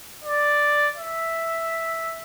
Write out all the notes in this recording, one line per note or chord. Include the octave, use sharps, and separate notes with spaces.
D5
E5